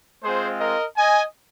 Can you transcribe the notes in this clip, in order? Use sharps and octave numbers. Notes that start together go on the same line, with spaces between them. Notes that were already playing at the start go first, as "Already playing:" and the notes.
G#3 C4 F4 G#4 C5
A#4 D#5
D#5 G#5